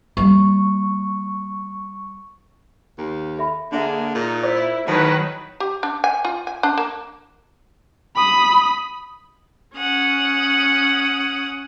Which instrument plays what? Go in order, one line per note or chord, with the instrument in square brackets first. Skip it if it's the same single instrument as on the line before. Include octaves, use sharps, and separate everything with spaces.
[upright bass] G3 A#3 [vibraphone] C#6
[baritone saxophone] D#2
[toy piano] A4 E5 B5
[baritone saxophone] D3 [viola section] A#3 G#4 [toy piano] D4 F#4 E5
[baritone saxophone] A#2 [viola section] D#4
[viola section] E4 [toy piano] C5 D5 D6
[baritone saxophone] A2 [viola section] D#3 F#3 B4 [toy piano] A4 A5
[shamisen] G4
D4
G#5
F4
G#5
D4
A#3
[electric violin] B5 D#6
[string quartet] C#4 F#5 D#6